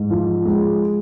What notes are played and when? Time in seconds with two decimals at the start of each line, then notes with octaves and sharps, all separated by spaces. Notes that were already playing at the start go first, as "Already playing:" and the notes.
Already playing: G#2
0.10 F3
0.45 G#3